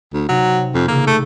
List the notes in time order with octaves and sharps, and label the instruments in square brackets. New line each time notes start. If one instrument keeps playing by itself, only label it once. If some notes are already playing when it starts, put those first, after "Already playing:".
[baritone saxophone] D2
[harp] C3 D#4 [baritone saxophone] F#3
[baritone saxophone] F2 [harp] F4 G4
[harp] A1 C#3 E6 [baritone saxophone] A#3
[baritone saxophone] A3